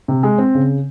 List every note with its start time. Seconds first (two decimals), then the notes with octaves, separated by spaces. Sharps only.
0.08 C3
0.23 G#3
0.38 C4
0.55 C#3